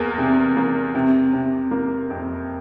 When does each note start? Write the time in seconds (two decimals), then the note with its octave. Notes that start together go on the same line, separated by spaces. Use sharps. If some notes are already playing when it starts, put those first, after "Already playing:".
Already playing: E2 A#3
0.18 C3
0.57 A#3
0.95 C3
1.33 C3
1.71 A#3
2.10 F2